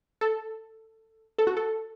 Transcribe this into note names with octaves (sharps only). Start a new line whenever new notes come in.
A4
A4
F#4
A4